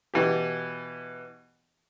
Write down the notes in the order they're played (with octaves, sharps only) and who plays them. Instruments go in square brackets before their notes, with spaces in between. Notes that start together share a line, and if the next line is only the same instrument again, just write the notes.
[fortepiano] B2 E3 G4